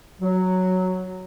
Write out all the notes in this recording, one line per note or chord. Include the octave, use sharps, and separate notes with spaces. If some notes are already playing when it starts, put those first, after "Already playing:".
F#3